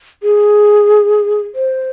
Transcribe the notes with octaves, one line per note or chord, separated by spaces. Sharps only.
G#4
C5